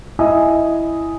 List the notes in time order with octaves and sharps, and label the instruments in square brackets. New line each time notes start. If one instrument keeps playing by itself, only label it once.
[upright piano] E4 D#5 E5 G#5 D#6